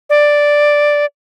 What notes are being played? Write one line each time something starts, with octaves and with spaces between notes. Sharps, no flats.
D5